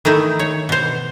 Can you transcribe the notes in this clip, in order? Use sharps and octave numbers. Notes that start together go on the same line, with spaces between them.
D#3 A3 D#4 E4
C#5
B2 C5